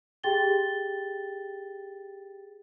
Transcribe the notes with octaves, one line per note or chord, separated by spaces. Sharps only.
G4 G#4 G5 A6 G7